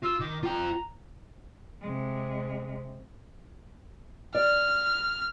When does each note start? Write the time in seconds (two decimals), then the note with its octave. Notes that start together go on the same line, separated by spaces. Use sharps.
0.03 F4 E6
0.20 D#3 D6
0.43 F4 G5 A#5
1.82 C3 G#3
4.35 D5 F6